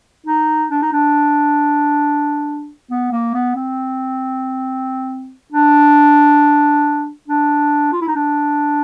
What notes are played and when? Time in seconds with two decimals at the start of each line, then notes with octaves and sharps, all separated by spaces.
0.27 D#4
0.71 D4
0.82 D#4
0.93 D4
2.91 B3
3.12 A#3
3.34 B3
3.56 C4
5.52 D4
7.28 D4
7.93 F4
8.01 E4
8.08 D#4
8.16 D4